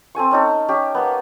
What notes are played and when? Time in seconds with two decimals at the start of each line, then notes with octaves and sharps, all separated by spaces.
0.15 C4 A4 G#5 C#6
0.31 C#4 D#4 A4
0.68 C#4 G4
0.95 A#3 B3